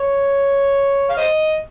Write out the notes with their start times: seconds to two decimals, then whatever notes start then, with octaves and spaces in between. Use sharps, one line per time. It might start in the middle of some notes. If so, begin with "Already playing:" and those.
Already playing: C#5
1.10 F5
1.17 C5 D#5